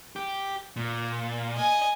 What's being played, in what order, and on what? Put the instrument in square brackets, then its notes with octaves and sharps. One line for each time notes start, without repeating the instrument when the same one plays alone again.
[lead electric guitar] G4
A#2
[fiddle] D#5 G#5